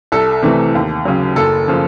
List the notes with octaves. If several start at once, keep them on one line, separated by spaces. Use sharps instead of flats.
C2 A4
C3 E3 A3
D#2
C#3 F#3
F#1 A4
C#3 F3